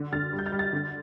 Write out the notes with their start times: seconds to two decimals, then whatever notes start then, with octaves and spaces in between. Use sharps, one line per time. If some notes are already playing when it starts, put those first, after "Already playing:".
Already playing: D3
0.12 D3 F6 A6
0.33 G3
0.39 G6
0.46 F6 A6
0.52 G3
0.59 F6 A6
0.73 D3